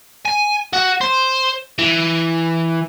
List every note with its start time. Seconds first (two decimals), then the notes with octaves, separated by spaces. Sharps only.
0.25 G#5
0.73 F#4
1.01 C5
1.78 E3